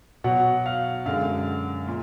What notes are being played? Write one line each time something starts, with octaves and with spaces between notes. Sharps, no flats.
B2 F#3 F#5
F5
F#2 D3 G#3 F5
A#2